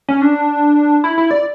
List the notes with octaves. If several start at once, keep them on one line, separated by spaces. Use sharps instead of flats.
C#4
D4
E4
E4
D5